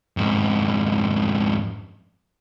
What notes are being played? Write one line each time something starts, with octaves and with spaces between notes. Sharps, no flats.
F2 G#2